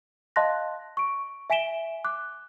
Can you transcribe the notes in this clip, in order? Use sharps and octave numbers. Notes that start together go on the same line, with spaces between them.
D#5 F5 A5 C6 F#6 A#6
C#6 D7
E5 G#5 B6 D7 E7 G7
D6 F#6